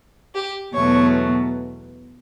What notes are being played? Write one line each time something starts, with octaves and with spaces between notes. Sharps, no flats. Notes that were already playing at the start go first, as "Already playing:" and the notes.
G4
E2 B2 F#3 A3 C#5